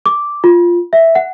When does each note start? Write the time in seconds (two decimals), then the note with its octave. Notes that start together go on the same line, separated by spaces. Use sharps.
0.06 D6
0.44 F4
0.93 E5
1.15 F#5